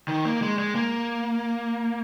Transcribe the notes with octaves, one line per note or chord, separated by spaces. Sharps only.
D#3
A#3
G#3
G#3
A#3